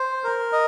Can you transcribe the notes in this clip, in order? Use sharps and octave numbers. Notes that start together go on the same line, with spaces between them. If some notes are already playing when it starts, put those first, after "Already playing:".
Already playing: C5
A#4
D#5